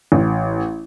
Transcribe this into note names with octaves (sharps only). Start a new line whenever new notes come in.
A1